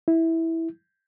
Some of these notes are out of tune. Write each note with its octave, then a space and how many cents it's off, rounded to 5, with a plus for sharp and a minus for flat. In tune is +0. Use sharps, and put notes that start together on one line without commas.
E4 -10